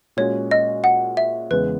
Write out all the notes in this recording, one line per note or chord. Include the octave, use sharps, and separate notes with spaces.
A#2 G#3 C#4 F#4 C#5
D#5
F#5
E5
E2 C#3 G#3 B3 B4